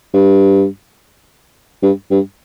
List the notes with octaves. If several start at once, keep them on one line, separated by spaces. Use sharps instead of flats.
G2
G2
G2